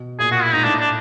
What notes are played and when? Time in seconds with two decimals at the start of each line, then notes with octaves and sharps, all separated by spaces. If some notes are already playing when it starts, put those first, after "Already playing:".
Already playing: B2
0.19 A#2 G#4
0.31 A#2 F#4
0.42 E4
0.53 G#2 D#4
0.64 A2 D4
0.80 D4